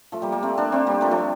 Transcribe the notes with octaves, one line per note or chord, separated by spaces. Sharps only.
F3 A3
G3 A#3
G3 A#3
A3 C4
A#3 D4
A3 C4
G3 A#3
F3 A3
F3 A3